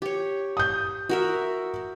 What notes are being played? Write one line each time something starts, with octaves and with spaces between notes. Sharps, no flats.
G4 C#5
D#6 G6
F#4 A#4 E5